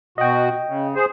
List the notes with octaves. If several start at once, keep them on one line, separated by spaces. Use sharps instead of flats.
B2 F#4 D#5 G5
C#3
G#4 C5